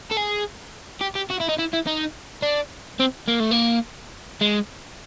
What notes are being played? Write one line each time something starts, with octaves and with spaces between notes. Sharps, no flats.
A4
G#4
G4
G4
F#4
E4
D#4
E4
E4
D#4
D4
C4
A#3
A3
A#3
G#3